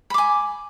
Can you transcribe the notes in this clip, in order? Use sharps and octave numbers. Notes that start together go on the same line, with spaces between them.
G#5 B5 D6